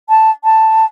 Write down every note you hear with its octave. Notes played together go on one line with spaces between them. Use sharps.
A5
A5